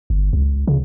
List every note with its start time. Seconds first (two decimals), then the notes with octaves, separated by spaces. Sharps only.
0.10 G1
0.33 C#2
0.67 C#3